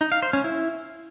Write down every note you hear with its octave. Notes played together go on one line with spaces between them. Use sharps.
D#4
F5
C5
C#4
E4